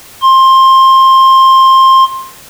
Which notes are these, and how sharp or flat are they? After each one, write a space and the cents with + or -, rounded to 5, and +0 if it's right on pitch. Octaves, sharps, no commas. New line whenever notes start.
C6 +20